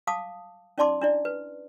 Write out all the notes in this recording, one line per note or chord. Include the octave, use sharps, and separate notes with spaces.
F5 A5 D6 D#6
C#4 D#4 D5 A5 C6 D6
D4 E4 D5
B4